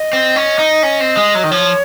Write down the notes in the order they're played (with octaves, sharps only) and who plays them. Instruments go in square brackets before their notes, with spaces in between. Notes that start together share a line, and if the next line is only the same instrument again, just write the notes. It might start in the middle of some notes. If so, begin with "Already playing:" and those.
Already playing: [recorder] D#5
[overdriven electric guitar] C4
C#4
D#4
C#4
C4
G#3
F#3
D#3
[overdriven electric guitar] F3 [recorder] C#5